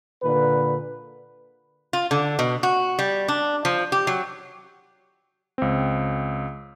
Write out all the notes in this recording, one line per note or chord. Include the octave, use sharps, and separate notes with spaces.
A#2 D3 B4
F4
D3
B2
F#4
G3
D4
F3
G4
F#3
C#2 C4